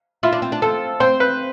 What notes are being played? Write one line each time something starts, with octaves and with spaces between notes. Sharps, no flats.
E4 F4
D4
C4
D4
C4 A4
C4 C5
B4